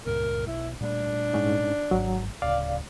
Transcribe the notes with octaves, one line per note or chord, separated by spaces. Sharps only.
C#2 G2 A#2 A#4
B1 E4
A#2 G3 A3 D4
G#2 C#4 D#4
G#1 G#2 F#3
D1 C#3 D5 F5